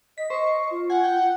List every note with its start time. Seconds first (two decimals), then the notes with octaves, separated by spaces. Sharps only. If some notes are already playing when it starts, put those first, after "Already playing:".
0.18 D#5 B6
0.30 C5 D#5 C#6
0.71 F4
0.90 F#5 G#5
1.04 G5